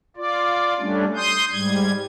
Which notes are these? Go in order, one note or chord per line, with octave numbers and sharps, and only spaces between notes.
F4 D5
G3 A3 C#4 D4
C6 D#6 G6
G#2 G3 G#6